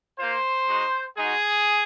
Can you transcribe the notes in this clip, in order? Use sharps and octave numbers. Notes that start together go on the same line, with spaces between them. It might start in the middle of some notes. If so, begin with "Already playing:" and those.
A#3 F4 C5
G#3 D#4 F#4
G#3 D#4 F#4 G#4